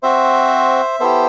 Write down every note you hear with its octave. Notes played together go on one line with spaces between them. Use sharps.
C4 F#4 C5 E5
B3 E4 G4 A4 C5